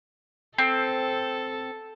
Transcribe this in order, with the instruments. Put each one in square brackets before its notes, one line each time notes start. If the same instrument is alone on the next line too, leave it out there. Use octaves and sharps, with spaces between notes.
[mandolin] C4 [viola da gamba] A4